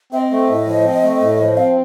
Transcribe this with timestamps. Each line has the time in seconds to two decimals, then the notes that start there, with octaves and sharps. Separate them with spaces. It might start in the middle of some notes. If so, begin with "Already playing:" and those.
0.13 C4 E5
0.17 D#5
0.31 A3
0.49 A2
0.66 F3
0.85 C4
1.03 A3
1.21 A2
1.40 F3
1.57 C4 F5